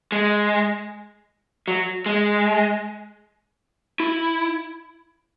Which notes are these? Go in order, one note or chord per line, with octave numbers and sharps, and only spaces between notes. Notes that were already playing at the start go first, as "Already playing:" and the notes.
G#3
F#3
G#3
E4